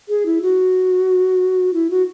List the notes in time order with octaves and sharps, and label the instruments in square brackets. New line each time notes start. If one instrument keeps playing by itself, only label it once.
[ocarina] G#4
E4
F#4
E4
F#4